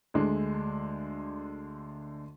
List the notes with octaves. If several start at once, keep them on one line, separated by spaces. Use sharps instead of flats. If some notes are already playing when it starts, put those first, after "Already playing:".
D2 D3 G#3 D4